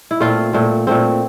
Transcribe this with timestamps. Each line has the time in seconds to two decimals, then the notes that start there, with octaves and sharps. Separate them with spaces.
0.11 E4
0.20 A#2 A3 C4 F4
0.53 A#2 A3 C4
0.87 A#2 A3 C4